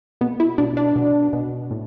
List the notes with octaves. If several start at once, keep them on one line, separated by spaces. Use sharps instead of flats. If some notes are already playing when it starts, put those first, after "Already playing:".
B2 B3
E4
B2 D4
D4
B2
B2
A2